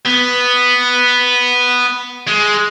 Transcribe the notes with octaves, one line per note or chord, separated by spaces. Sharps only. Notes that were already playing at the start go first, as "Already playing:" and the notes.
B3
G#3